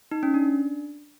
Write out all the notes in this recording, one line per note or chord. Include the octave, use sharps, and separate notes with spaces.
D#4
C#4
D4